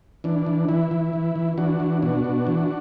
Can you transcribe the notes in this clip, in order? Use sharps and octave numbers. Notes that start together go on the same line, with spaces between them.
E3 D4
E3
E3 E4
E3
E3
E3
E3 D4 F#4
E3
B2 D4 F#4
B2
E3